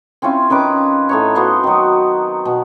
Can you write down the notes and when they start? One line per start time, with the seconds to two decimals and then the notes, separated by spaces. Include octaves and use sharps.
0.22 C4 C#4 E4 F4
0.50 D#3 C#4 B4 D6
1.09 A2 D#4 C#5
1.35 B3 F#4 C5 D#5
1.63 D#3 F#3
2.45 B2